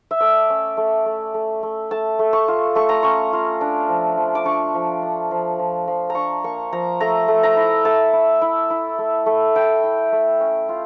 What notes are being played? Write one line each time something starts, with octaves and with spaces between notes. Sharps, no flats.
E5
A3 D5
C#4
A3
A3
A3
A3
A3 A5
A3
C#6
F4
A3 C#6
A#5
C#4 C#6
F4
D4
F3
F3
D6
D4 C#6
F3
D4
F3
F3
F3
A#5
D4 C#6
A#3 C#6
F3 A#5
A3 A#5
A3
A#5
E4
A3 A5
E4
E4
E4
A3
A3
E4 G5
E4
A3
C#4
F4